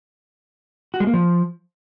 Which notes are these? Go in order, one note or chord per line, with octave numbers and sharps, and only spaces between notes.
F#4
G#3
A#3
F3